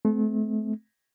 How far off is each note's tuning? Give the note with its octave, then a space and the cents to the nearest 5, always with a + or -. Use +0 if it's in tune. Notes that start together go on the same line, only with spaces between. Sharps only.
A3 -35 C4 -35